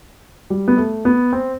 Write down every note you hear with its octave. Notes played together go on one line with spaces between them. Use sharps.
G3
B3
A3
B3
C4